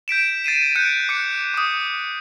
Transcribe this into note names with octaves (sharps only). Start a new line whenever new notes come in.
G6 B6 D7 E7
A6 C7 D#7 E7
F#6 G6 C#7 D7
D6 F#6 C#7
D6 D#6